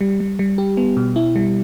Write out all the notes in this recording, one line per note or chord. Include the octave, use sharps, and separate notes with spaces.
G3
G3
G3
G4
B3
B2
E4
G3